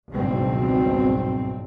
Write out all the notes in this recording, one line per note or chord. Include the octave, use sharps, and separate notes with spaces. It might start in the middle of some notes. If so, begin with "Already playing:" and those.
G#1 C#2 G2 B2 F#3 C4